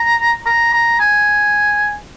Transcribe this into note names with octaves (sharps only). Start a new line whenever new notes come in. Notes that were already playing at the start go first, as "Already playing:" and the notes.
Already playing: A#5
A#5
A#5
G#5